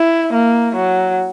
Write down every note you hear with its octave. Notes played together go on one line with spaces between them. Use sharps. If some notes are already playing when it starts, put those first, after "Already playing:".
Already playing: E4
A#3
F#3